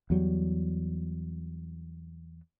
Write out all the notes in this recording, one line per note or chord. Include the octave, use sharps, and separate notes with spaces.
E2 F#3 G3